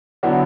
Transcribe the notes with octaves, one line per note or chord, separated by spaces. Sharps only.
D3 F#3 B3 E4